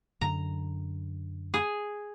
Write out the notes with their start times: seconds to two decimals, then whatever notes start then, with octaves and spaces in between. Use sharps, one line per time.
0.21 F#2 D3 A#5
1.54 G#4